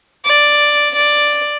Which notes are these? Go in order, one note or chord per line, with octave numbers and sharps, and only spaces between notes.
D5
D5